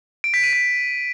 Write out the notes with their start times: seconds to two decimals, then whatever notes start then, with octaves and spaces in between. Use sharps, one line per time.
0.24 D7
0.34 B6
0.43 D#7
0.53 B6